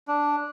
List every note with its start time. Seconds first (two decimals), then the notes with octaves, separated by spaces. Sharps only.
0.08 D4